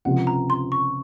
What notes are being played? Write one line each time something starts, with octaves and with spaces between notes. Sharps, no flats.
C#2 C3 F3 C4 F4 F#5
A#5
C6
C#6